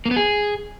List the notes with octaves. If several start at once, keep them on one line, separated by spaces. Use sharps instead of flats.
A#3
B3
G#4